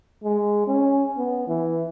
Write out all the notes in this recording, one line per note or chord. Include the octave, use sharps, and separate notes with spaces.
G#3
C#4
B3
E3